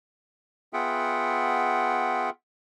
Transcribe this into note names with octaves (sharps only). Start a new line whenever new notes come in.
B3 F4 G#4 E5 F#5 G5